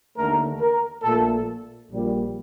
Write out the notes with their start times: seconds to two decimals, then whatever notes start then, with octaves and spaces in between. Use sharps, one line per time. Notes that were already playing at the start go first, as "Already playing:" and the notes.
0.17 D#2 D3 A3 A#4
0.60 A#4
1.03 A#1 A#2 A3 A4
1.90 A#1 A#2 G3